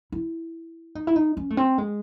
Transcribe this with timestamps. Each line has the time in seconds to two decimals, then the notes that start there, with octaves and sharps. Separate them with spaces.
0.12 E4
0.95 D#4
1.07 E4
1.16 D#4
1.37 C#4
1.50 A3
1.57 C4
1.78 G#3